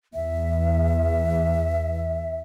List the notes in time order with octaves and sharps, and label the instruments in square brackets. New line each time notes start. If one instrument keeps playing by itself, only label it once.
[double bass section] E2 [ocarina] E5